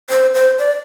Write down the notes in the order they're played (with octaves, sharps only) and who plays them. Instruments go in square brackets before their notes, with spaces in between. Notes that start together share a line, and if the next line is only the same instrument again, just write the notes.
[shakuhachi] C5
C5
D5